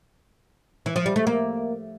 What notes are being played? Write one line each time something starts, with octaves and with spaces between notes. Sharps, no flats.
E3
F3
G3
A3
A#3